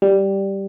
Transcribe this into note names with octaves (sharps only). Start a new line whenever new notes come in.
G3